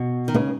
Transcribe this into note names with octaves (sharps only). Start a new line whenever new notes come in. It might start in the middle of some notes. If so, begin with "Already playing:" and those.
Already playing: B2
D#3
A#2 C#3 G#3 B3 D#4